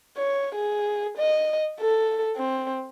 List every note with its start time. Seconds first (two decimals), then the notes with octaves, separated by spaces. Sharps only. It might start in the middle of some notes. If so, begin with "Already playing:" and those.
0.17 C#5
0.55 G#4
1.18 D#5
1.80 A4
2.36 C4